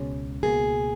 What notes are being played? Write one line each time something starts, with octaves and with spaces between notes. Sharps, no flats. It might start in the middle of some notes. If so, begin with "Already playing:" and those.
Already playing: C#2 B2 G#3 C#4
C#2 B2 A#3 G#4